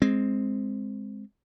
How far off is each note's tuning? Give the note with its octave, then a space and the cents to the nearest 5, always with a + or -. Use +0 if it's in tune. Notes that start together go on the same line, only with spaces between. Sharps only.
G#3 +0 C4 +0